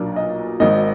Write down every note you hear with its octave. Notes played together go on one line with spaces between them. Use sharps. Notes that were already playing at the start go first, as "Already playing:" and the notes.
Already playing: B1 A#2 F#3 A#3 D4
D#5
G#1 G#2 D#3 D#5